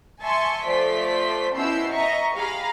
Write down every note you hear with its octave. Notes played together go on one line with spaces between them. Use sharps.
E5 G#5 A5 C6 C#6
F3 A3 D5 C6 B6
B2 C#4 E4 E6 G6 C7
D#5 E5 A#5 C#6
G4 G#4 F5 A#5 B5